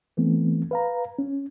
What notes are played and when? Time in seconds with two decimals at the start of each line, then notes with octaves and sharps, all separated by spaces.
0.17 E3 A3 B3 C4
0.71 B4 F5 A#5
1.19 C#4